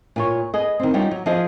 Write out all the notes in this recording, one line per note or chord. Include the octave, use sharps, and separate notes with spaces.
A#2 F4 C#5
G#4 B4 D#5
D#3 C4
G3 B3 C#4 D#4 F4
F#3
F3 G#4 C5 D#5 F5